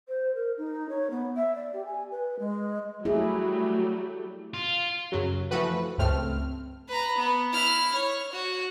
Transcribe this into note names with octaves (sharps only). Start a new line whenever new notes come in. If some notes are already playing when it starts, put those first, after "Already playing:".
C5
A#4
D#4
C#5
B3
E5
D5
G4
G#5
B4
G#3
F#3 G3 A3 E4 G#4
F4
F#2 C#3 F#3
E3 F3 A3 F#4 B4
C#2 G2 A3 C4 F6
B4 A#5
B3
E4 F6
C#5
F#4